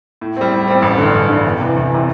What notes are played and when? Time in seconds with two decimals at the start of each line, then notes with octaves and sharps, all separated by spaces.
0.21 A2
0.37 G3 C4
0.51 A2
0.68 G3 C4
0.82 A1
0.98 G2 D3
1.14 A1
1.29 G2 D3
1.44 E2
1.60 C3 E3
1.76 E2
1.91 C3 E3